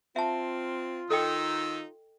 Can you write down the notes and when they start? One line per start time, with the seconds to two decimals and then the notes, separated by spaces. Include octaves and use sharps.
0.16 C4 F4 E5 A5
1.10 D#3 D#4 A4 D#5 G5 E6